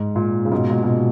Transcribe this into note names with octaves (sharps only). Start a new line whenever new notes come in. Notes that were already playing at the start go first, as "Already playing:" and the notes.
Already playing: G#2
A#2
C#3
G#2 B2
A#2
B2